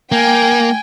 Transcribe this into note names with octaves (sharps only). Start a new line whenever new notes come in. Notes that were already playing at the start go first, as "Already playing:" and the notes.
A#3 G5 G#5